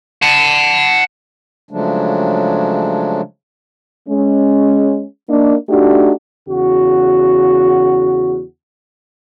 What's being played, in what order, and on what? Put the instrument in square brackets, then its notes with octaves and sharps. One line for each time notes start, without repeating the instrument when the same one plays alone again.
[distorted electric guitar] F#5 A5
[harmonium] C#3 F3 F#3 G#3 A3 D4
[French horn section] G#3 C#4
A#3 D4 D#4
A3 D4 D#4 F#4 G4
[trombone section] E2 C#3 F#4